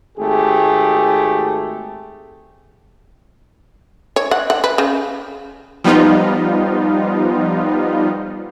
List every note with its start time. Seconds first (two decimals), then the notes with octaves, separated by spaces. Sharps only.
0.18 G#1 A3 G4 G#4
4.16 C#5
4.31 F#5
4.50 F#5
4.64 B4
4.78 C#3
5.84 F3 G3 B3 D#4 F4